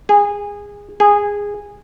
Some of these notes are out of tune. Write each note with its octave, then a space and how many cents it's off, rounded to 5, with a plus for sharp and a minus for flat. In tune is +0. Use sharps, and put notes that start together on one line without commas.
G#4 -20
G#4 -15